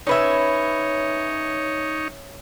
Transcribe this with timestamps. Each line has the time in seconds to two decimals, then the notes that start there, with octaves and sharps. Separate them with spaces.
0.07 C#4 D#4 B4 C#5 E5